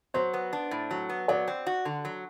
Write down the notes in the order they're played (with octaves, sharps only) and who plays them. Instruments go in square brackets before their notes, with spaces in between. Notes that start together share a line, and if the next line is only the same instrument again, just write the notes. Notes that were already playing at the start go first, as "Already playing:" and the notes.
[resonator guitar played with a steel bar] F#3 [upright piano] C5
[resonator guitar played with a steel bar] B3
D4
A2
F#3
B3
[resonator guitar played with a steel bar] F#3 [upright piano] D5
[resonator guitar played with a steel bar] C4
F#4
D3
F#3